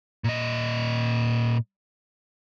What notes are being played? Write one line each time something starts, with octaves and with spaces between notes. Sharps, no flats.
A#2 D#5